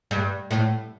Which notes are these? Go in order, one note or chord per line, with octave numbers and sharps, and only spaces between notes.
G2
A2